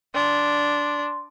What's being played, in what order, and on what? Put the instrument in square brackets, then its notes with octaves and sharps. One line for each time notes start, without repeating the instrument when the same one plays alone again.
[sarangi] D4 [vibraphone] C6